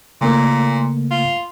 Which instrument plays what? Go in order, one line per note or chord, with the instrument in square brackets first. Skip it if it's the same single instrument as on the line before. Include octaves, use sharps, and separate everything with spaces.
[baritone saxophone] A#2 [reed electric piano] C#3 A3 A#3
[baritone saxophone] F4